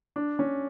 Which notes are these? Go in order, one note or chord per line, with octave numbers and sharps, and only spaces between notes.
D4
C#4